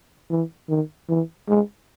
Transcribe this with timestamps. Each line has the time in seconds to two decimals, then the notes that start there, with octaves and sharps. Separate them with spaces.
0.30 E3
0.69 D#3
1.09 E3
1.48 G#3